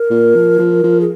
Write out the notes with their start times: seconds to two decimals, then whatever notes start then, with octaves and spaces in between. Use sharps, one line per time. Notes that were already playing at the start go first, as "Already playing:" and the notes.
Already playing: A#4
0.10 A#2
0.35 F3
0.59 F3
0.84 F3
1.01 G#4